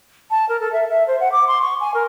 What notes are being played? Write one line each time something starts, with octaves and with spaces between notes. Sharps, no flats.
A5
A#4
A4
E5
E5
C5
F#5
D6
C6
C#6
G#5
A#4